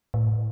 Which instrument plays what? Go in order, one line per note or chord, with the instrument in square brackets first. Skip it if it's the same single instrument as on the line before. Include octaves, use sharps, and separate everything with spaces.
[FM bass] A2